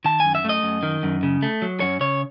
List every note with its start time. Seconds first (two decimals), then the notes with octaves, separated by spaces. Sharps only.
0.05 D#3 A5
0.20 F#2 G#5
0.35 E5
0.44 A3 D#5
0.63 F#2
0.83 D#3
1.03 F#2
1.23 C#3
1.42 A3
1.62 F#3
1.80 F#2 C#5
2.00 C#3 C#5